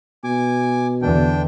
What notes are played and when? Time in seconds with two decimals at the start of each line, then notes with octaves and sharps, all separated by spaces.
0.24 B2 G#5 D6
1.02 E2 D3 D4 G5